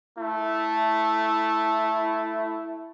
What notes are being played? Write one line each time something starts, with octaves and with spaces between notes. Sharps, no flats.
A3 E4